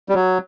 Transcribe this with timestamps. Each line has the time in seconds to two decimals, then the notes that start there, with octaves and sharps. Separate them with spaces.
0.09 G3
0.14 F#3